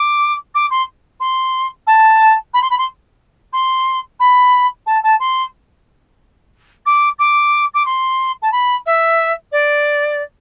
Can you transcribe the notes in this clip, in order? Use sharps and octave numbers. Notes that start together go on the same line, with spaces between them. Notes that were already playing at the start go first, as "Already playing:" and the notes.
Already playing: D6
D6
C6
C6
A5
B5
C6
B5
C6
C6
B5
A5
A5
C6
D6
D6
D6
C6
A5
B5
E5
D5